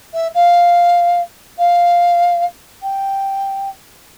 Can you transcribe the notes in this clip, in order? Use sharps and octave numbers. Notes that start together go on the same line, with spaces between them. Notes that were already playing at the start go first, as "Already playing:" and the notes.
E5
F5
F5
G5